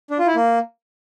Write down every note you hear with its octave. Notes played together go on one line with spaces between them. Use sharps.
D4
F4
E4
A#3